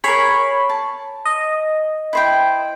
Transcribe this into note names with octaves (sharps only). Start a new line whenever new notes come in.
G#4 A#4 C#5 B5
A5
D#5
E4 C5 G5